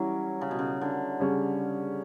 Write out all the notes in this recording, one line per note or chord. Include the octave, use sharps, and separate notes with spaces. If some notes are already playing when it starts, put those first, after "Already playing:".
Already playing: E3 F#3 G3 C#4 E4
C#3
B2
C#3
D3
C#3 G3 C#4